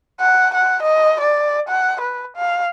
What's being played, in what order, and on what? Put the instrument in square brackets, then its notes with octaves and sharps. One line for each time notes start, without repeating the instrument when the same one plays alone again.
[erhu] F#5
F#5
D#5
D5
F#5
B4
F5